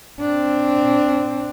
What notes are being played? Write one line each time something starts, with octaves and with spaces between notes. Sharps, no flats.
C4 D4